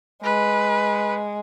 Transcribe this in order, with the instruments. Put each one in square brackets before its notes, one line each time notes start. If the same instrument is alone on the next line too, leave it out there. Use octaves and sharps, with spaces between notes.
[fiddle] G#3 [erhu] B4